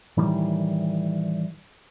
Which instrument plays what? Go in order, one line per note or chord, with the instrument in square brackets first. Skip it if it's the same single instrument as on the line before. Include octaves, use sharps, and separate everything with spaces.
[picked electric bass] A2 D#3 E3 G3